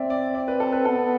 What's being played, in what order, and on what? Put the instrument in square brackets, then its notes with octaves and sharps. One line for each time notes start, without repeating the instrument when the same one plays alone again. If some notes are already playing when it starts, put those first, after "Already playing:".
Already playing: [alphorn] C4 [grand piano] D5 E5
[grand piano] D5
D5
B4
A4
B4
[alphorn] B3 [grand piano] A4